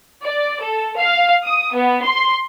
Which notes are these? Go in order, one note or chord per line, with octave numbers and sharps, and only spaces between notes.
D5
A4
F5
D#6
B3
C6